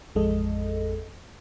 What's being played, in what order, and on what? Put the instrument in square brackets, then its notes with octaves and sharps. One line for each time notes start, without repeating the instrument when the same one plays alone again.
[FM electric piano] A1 F2 G#3 A4 D#5